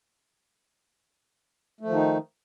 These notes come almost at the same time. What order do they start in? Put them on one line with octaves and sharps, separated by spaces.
A3 F3 D#3 D#4